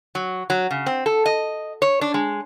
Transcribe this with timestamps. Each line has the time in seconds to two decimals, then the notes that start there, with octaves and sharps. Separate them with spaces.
0.15 F#3
0.50 F#3
0.71 C#3
0.86 C4
1.06 A4
1.26 D#5
1.82 C#5
2.01 D4
2.14 G#3